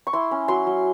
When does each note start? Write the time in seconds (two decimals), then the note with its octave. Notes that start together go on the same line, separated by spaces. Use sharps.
0.07 C#6
0.13 E4 C6
0.31 C#4
0.48 F#3 C6
0.67 F#3